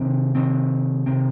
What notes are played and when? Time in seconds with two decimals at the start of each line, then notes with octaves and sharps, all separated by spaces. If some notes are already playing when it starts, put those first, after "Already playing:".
Already playing: C3 D#3 C4
0.35 C3 D#3 C4
1.06 C3 D#3 C4